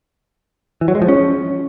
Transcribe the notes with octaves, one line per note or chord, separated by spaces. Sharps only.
E3
F#3
G#3
F3
C#4